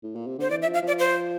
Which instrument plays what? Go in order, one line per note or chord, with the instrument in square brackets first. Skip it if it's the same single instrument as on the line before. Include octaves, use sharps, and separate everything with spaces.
[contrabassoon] A2
A#2
C3
[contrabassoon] D3 [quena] C5
[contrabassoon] E3 [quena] D5
[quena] E5
[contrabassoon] F3
[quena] F5
[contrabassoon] F3 [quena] D5
[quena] C5